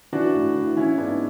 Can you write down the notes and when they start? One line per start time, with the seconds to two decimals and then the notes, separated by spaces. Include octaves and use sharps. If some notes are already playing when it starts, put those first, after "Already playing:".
0.13 E3 D4 F#4
0.34 A2
0.55 E3
0.77 E3 C#4 E4
0.98 G#2 B3 D4